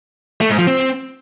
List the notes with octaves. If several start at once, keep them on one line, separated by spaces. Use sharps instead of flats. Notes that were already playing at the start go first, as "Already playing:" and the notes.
A3
G#2
F3
C4